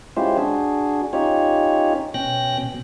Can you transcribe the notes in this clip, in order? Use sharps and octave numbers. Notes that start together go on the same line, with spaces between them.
G#3 C#4 E4 F4 G4 C5
D4 F#4 G#4
C#4 D#4 F4 G4 C#5
B2 C#4 G5 F#6 A#6
B2